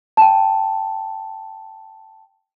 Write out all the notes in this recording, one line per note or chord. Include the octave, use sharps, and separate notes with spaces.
G5 A5